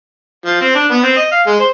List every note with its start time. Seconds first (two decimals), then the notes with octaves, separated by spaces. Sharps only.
0.46 F3
0.61 C4
0.75 D4
0.91 B3
1.03 C4
1.17 D#5
1.32 F5
1.47 G#3
1.59 C5